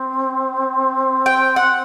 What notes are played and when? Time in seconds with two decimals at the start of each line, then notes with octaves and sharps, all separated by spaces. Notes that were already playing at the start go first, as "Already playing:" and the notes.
Already playing: C4
1.26 G5
1.56 F#5